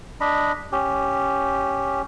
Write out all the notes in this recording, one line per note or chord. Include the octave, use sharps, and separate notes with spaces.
D4 D#5 B5
C#4 G4